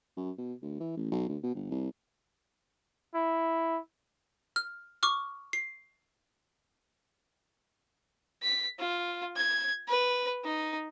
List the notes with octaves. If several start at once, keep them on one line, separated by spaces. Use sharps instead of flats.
F#2
B2
D2
E3
A1
B1
D2
B2
G1
C2
E4
F6
C#6 D6 F6
C7
B6
F4
G#6
B4
D#4